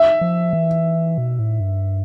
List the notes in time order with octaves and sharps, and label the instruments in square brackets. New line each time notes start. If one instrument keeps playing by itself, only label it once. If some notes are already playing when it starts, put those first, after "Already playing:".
Already playing: [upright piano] E5
[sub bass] F3
E3
B2
A2
G2